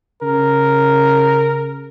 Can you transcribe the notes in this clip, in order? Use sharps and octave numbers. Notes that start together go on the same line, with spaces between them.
C#3 A#4